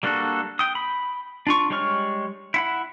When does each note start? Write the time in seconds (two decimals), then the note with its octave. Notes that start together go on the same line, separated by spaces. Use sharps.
0.03 G3 A#3 D4 F#4 A4
0.59 G5 D#6
0.75 B5
1.47 D4 F4 C#6
1.70 G3 G#3 C#5 C#6 F6
2.54 E4 F#5 B5